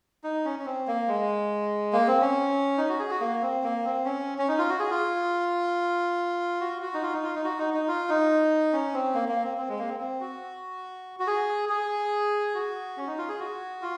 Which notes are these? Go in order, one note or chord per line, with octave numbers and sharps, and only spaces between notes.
D#4
C#4
C#4
C4
A#3
G#3
A#3
C4
C#4
D#4
F#4
G#4
F#4
A#3
C4
A#3
C4
C#4
C#4
D#4
F4
F#4
G#4
F4
F#4
F#4
D#4
F4
D#4
F4
D#4
F#4
D#4
D#4
F4
D#4
C#4
C4
A#3
A#3
C4
C4
G#3
A#3
C4
C4
F#4
F#4
G#4
G#4
F#4
C#4
D#4
F4
G#4
F#4
F4